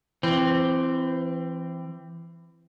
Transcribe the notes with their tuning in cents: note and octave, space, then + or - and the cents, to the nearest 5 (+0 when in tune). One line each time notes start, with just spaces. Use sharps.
E3 +25 C4 +0